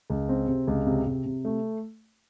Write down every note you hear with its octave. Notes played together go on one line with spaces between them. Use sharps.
C#2
C4
C3
C#2
C3
C3
C3
A3